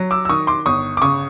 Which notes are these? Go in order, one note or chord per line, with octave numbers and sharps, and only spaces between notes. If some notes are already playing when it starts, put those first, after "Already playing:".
Already playing: F#3
D6 E6
E6
D#3 C#6 D#6
C6 D6
G1 C#6 D#6
D6
C#3 C#6 D#6